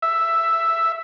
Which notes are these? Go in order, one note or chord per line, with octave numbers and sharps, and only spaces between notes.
E5